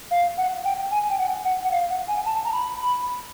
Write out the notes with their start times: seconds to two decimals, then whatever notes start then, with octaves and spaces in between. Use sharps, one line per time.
0.11 F5
0.38 F#5
0.65 G5
0.91 G#5
1.10 G5
1.19 F#5
1.45 F#5
1.64 F#5
1.72 F5
1.90 F#5
2.08 G#5
2.26 A5
2.45 A#5
2.53 B5